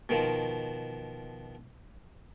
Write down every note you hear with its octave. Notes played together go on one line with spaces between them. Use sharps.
B2 D#3 F3